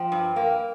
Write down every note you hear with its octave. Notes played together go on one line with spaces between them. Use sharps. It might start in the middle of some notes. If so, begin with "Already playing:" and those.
Already playing: F3 G5
G2
A#3